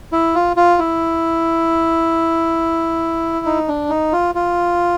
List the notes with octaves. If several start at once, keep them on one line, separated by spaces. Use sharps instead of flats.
E4
F4
F4
E4
D#4
D4
D#4
F4
F4